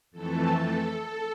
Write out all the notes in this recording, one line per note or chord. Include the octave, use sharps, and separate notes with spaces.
F2 E3 A3 A4
A4
A4